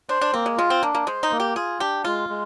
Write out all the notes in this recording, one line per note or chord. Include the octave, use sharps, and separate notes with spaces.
D4 C5
D4
A#3 C4
G#3
G#3 F4
C4
A#3 D4
A#3
G#3 C5
D#4
A#3
G4
F4 G#4
D4 G4
G#3 F4
G#3